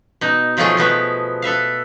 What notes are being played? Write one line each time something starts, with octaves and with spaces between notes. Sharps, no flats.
B2 D#4
B2 F3 F#3 A3 F4 G#4
B2 F3 B3 E5
A4 B4 E5 F5